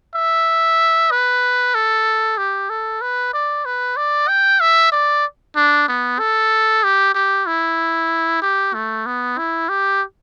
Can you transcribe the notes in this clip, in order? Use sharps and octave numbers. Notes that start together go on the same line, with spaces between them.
E5
B4
A4
G4
A4
B4
D5
B4
D5
G5
E5
D5
D4
B3
A4
G4
G4
E4
G4
A3
B3
E4
G4